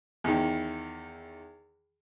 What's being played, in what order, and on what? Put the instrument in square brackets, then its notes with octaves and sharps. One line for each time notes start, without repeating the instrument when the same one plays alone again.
[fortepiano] E2 D#3